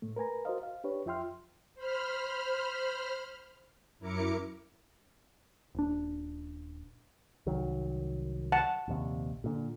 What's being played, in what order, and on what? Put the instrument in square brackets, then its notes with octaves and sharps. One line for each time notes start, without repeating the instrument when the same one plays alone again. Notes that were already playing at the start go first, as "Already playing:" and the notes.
[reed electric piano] A2 A3
A#4 B4 G#5 A#5
F#4 A#4 C5 D#5 F5
F5
D4 G4 B4 C#5
F2 F4 E5 G5 C6 F6
[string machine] C5 B5 F6
F#2 E4 A#4 D6 C#7
[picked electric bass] D#1 D4
C2 D#3 F#3
[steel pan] F#5 A5
[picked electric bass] A#1 D#2 C3
A#2 D3